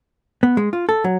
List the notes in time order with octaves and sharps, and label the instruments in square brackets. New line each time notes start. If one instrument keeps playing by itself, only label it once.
[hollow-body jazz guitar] B3
G#3
F4
A4
F#3